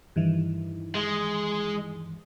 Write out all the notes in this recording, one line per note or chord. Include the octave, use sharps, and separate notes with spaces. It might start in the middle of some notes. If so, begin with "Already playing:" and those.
G2 D#3 E3
G#3